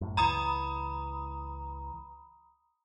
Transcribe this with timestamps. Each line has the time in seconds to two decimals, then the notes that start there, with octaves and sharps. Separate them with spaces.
0.01 F#2 A2
0.17 C#2 E3 A#5 B5 D#6